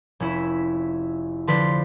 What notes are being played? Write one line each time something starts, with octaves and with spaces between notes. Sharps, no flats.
F1 C#4 E4 E5
D3 F3 B4 D5 C6 B6